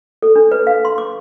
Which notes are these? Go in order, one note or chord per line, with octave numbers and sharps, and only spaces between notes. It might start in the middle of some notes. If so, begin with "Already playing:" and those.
A4
D4
B4
F5
C6
D6